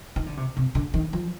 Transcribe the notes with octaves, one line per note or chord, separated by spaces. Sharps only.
D#3
D3
C3
C3
D3
D#3
F3